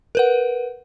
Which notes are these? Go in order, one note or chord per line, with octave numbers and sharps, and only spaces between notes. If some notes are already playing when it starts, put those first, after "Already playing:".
A#4 B4 F#5